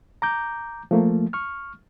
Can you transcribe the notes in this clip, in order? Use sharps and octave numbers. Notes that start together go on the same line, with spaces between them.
A#5 D6 G6
F3 A3 A#3
C#6 F6